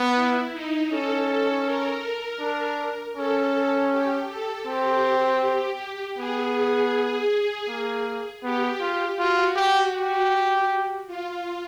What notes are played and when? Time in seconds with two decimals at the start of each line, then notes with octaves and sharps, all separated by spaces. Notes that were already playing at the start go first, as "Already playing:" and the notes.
Already playing: B3
0.15 E4
0.53 D#4
0.90 C#4 A4
1.29 A4
1.65 A#4
2.41 D4
3.17 C#4 A4
3.91 G4
4.29 A4
4.67 C4 G4
5.42 G4
6.18 B3 G#4
7.69 A#3
8.43 B3 G4
8.80 F4
9.18 F4 F#4
9.56 G4
9.94 G4
11.07 F4